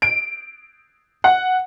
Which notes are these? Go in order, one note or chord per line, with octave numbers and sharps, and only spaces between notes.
D7
F#5